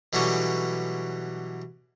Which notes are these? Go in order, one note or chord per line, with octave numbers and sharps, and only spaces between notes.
B2 D3 E3 F#3 G3 C#4